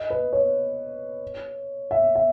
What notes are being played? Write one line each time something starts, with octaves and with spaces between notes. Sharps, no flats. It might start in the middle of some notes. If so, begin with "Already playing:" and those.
Already playing: D#5
B4
C#5
E5
E5